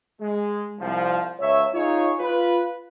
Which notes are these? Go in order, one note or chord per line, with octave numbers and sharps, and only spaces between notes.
G#3
C2 F3
C#2 C#5 E5
D#4 F4 G#4 C#5
F4 B4